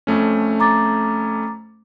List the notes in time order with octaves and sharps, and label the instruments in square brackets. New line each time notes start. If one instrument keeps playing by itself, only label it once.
[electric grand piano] F2 A3 C#4
[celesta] A#5 D6 A6